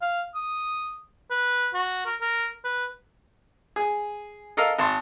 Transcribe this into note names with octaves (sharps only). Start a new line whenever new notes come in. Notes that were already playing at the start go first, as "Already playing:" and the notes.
F5
D#6
B4
F#4
A#4
A#4
B4
G#4
A4 A#4 D#5 F5 E6
G#1 A5 C6